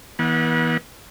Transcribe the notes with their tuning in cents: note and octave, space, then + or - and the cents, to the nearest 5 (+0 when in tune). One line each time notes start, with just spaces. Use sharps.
E3 -35 B3 -40 F#5 -10